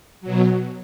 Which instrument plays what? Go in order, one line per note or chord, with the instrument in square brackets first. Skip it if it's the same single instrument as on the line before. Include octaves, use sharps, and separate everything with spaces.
[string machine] B2 F#3